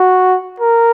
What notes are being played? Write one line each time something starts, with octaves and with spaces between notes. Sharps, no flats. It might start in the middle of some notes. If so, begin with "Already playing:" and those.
Already playing: F#4
A#4